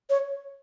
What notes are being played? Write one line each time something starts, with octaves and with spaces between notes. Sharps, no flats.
C#5